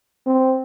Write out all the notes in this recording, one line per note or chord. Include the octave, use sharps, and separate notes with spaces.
C4